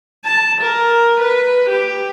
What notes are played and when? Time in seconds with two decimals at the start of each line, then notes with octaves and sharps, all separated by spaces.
0.25 A5
0.61 A#4
1.20 B4
1.69 G4